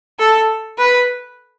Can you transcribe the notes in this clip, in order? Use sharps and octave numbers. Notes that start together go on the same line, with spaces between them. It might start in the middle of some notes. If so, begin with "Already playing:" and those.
A4
B4